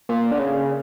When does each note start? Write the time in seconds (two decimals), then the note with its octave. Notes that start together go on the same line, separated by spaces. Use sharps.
0.09 A#2
0.31 D3
0.39 C#3